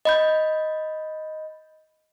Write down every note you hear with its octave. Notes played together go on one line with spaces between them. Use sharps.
D#5 B5 G6